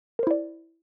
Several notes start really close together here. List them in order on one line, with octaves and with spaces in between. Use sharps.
A#4 C5 E4 D5